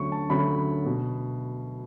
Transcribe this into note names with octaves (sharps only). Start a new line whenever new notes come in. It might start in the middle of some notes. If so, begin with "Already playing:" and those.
Already playing: D2 D3 F#3 A3 C#4 C#6
A5
D2 D3 F#3 A3 C#4 B5
B2